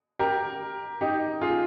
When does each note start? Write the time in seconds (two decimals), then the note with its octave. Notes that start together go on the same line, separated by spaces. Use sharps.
0.19 G4 A#4
1.01 D#4 G4
1.41 F4 G#4